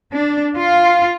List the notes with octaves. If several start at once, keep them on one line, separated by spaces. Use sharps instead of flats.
D4
F4